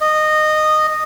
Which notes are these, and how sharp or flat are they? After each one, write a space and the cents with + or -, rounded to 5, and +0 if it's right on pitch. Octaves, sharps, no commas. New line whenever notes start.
D#5 -15